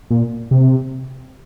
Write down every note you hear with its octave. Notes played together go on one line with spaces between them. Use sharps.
A#2
C3